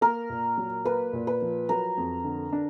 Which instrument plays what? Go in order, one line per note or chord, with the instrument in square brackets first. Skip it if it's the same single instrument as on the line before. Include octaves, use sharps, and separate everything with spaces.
[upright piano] A#3 [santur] A#4
[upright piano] A#2
F#3
[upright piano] A#3 [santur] B4
[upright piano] A#2
[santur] B4
[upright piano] F3
[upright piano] F#3 [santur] A#4
[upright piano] F2
D3
D4